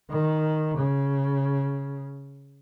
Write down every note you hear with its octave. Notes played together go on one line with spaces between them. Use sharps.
D#3
C#3